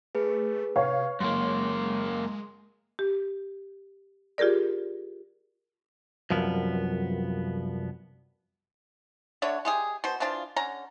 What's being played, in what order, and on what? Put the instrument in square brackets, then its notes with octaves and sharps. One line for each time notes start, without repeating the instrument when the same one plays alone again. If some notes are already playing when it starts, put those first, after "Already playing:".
[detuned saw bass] A3 [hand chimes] G#4 B4
[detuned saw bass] C3 [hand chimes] B4 [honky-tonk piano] C#5 F5
[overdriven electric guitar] F#2 A#3 [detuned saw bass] G#3 [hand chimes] C6
[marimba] G4
F4 G4 G#4 A#4 D5
[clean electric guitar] C2 F#2 F3 B3
[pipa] D3 A3 D4 C#5
G#3 G4 G#4
B2 C5
E3 F3 D4 F4
D3 C#4 A#5